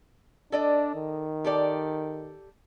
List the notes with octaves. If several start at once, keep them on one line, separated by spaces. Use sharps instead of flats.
D4 A4 D5 D#5
D#3
G4 A4 D5